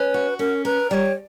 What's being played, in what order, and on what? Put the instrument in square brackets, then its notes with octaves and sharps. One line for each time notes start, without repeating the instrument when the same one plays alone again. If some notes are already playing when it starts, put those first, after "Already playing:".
Already playing: [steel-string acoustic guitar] C#4 [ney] B4
[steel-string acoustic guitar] F#4
[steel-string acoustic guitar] C#4 [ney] A#4
[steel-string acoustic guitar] A#4 [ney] B4
[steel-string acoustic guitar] G3 [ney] C#5 D5